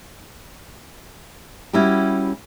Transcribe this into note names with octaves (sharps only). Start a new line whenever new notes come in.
G3 C#4 E4 F#4 G4